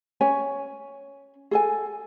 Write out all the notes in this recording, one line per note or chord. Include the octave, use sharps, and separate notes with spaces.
C#4 C#5 G#5
G#4 A4 G#5